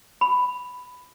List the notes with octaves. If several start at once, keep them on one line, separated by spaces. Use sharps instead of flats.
B5